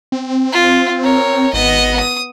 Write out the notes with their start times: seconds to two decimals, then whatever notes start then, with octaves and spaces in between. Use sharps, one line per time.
0.12 C4
0.53 F4
1.03 A#4 C#5
1.54 G#1 B3 D#5
2.00 D#6